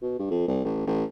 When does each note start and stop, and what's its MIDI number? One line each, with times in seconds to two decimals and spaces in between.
0.02 0.17 47
0.19 0.28 43
0.30 0.46 41
0.48 0.59 36
0.65 0.82 33
0.87 1.04 33